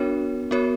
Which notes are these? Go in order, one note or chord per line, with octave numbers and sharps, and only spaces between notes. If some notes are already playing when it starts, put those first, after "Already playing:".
Already playing: B3 D4 F#4 A#4 C#5
B3 F#4 A#4 C#5